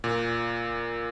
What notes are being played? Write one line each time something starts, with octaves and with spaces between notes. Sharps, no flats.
A#2